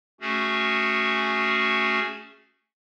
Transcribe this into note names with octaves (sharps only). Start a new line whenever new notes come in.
A3 C#4 F#4 G#4